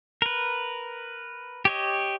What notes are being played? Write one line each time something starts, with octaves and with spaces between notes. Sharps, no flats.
A#4 B4
G4 C#5 D#5